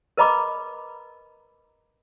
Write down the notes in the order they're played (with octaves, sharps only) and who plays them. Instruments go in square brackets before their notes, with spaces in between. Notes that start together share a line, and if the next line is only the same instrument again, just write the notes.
[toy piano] A#4 B4 D#5 A#5 B5 D6